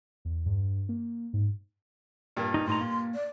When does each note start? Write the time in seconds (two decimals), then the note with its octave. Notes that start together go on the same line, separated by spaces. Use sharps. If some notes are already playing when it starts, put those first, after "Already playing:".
0.25 E2
0.46 G2
0.89 A#3
1.33 G#2
2.37 G2 A#2
2.54 D#4
2.68 A2 D#4 A#5 C6
2.81 A#3
3.15 D5